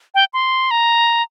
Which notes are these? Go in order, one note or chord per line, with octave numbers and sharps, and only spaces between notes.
G5
C6
A#5